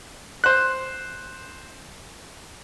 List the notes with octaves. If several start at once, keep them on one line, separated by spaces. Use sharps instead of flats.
C5 F#6